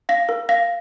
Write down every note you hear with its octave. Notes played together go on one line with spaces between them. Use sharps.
F5 A#6
A#4
F5 A#6